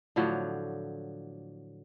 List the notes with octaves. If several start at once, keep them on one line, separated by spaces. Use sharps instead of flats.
A2 D3 F3 F#3